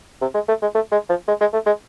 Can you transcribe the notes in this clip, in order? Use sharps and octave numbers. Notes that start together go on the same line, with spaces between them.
C3
G#3
A3
G#3
A3
G#3
F3
G#3
G#3
A3
G#3